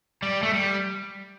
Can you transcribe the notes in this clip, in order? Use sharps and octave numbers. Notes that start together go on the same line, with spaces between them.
G3
A3
G3